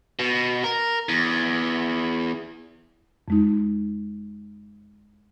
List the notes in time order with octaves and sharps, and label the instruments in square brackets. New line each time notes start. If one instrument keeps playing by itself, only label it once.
[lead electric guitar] B2
A#4
E2
[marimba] F2 G#3 D#4